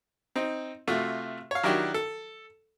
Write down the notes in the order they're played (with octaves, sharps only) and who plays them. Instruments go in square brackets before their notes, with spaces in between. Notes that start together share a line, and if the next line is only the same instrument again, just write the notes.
[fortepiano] C4 D#4
C3 A3 F4 F#4
C#5 F5
D#3 F#3 D4 E4 F#4 G4
A4